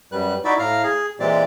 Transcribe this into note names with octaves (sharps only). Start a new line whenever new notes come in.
F#2 G3 B4 F#6
D#4 E4 F#4 D5 E5 B5
A2 F5 A#5 F6
G#4
A#2 E3 G#3 C4 G4 D5